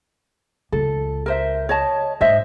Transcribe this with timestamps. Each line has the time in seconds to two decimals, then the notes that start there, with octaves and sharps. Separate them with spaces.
0.72 C#2 A4
1.26 A#4 C5 E5
1.69 C#5 D#5 A5
2.21 G#2 C5 D#5 E5